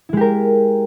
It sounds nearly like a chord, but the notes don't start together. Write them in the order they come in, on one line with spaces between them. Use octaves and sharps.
E4 G#3 G4 A#4